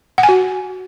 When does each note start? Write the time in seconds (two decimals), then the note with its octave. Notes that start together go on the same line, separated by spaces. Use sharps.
0.18 F#5
0.23 G#5
0.29 F#4